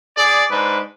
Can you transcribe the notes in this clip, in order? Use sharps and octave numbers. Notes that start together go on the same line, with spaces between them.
G#4 D5
G#2 D4 B4